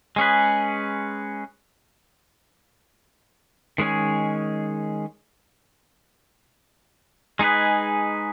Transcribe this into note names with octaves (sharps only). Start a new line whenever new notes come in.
G#3 C#4 G#4 B4
D#3 G#3 C#4 G#4
G#3 D#4 G#4 B4